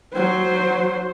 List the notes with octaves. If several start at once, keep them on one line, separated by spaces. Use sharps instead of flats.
F#3 C5